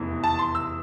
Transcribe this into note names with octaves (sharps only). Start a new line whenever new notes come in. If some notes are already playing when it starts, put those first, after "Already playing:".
Already playing: F1 E2 E3
A5
C6
E6